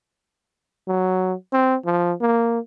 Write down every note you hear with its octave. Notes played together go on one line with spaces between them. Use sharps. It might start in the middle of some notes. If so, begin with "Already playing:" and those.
F#3
C4
F3
A#3